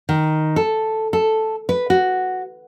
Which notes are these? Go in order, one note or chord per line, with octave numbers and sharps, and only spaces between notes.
D#3
A4
A4
B4
F#4